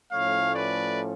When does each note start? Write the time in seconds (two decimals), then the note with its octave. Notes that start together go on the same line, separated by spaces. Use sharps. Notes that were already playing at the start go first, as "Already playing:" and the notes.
0.12 A2 F3 A3 C#4 C#5 F5
0.55 B4 D5